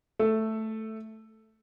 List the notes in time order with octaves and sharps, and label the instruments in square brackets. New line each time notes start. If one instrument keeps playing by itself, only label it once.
[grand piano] A3 A4